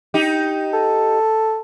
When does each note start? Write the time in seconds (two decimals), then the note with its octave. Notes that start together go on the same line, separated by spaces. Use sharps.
0.14 D#4 G4
0.73 A4